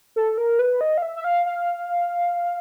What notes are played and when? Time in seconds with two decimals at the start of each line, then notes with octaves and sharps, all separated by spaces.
0.16 A4
0.38 A#4
0.59 B4
0.81 D#5
0.98 F5
1.02 E5
1.16 E5
1.24 F5
1.46 F5